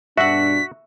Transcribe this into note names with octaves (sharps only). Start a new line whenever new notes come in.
G2 B2 D4 F#4 E5 F#5 B6